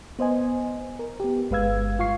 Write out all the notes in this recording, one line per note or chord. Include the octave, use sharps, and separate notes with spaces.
B3 C5 D#5 G#5
A#4
B3 G4
G1 G#3 B4 F5 E6 G#6
G2 F4 F5 C#6 C7